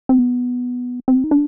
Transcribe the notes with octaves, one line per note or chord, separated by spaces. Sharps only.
C4
B3
C4
D#4
D4